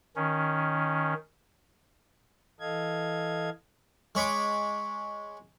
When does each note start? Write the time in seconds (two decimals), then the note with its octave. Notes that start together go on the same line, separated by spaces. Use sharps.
0.16 D#3 C#4
2.60 E3 A4 D#5 F5 G#6
4.15 G#3 C#5 B5 D6